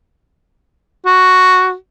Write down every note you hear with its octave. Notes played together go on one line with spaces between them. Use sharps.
F#4